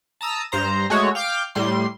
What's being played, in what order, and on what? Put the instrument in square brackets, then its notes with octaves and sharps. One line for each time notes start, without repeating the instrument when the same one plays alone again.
[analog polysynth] A5 A#5 D#6 E6
G2 C5 A#5
G#3 A3 F#4 C#5
F5 G5 D6 F6 G6
A2 G3 C6